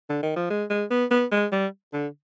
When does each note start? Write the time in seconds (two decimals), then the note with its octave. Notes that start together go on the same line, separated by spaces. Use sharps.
0.09 D3
0.23 D#3
0.36 F3
0.50 G#3
0.70 G#3
0.91 B3
1.11 B3
1.32 G#3
1.52 G3
1.93 D3